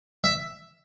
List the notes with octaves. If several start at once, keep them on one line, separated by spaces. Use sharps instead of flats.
E5